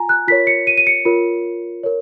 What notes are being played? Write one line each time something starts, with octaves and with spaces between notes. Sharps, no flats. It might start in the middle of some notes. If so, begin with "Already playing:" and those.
Already playing: F4 G#5 A#5
F#6
F4 A#4 C#5 B6
C#7
D#7
D#7
C#7
F4 A#4 C#5
A#4 C#5